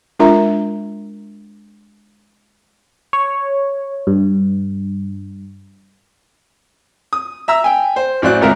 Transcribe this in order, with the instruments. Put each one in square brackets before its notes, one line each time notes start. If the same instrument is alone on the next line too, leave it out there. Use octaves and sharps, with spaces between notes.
[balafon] G#3 D4 F4 A#4 E5 A#5
[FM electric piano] C#5
G2
[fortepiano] D#6
E5 A#5 E6
G5 G#5
C5
A1 F#3 C5 D5 F#6
G#1 C#2 A#4 E5